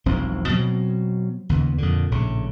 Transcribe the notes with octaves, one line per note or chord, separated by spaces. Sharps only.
E1 B1 F3 C4
B2 F#3 C4
D#2 C#3 B3
F2 A#2 D3
A#1 A2 C#3